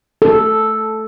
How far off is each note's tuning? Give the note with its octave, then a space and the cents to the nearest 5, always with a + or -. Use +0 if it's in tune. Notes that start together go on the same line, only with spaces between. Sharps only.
A4 -5